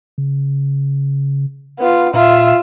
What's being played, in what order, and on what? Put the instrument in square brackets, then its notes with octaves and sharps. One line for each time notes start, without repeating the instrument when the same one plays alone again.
[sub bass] C#3
[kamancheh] B3 F4
[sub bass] A#2 [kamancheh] F4 E5